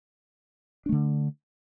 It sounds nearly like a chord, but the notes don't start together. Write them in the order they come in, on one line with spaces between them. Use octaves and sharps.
D4 A3 D3